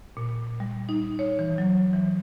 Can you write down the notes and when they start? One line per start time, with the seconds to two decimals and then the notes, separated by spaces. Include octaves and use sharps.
0.17 A#2
0.60 G3
0.89 D#4
1.19 C#5
1.39 E3
1.58 F#3
1.93 E3